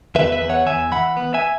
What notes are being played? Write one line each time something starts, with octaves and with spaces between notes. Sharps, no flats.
E2 B4 E5
B4 E5
E2
C#5 F#5
E2 E5 G#5
E3 F#5 B5
B3
E5 G#5